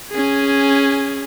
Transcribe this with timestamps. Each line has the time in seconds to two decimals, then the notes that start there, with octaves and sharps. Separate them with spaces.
0.11 C#4 G#4